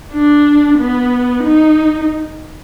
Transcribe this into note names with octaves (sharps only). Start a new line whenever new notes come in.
D4
B3
D#4